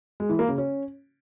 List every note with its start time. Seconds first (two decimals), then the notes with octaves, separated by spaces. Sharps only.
0.20 G#3
0.29 E3
0.39 A#3
0.48 C#3
0.58 C#4